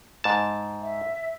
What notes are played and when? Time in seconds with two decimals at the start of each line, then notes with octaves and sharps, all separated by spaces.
0.24 G#2 A5
0.82 E5